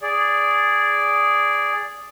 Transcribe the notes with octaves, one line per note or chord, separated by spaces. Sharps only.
G#4 D5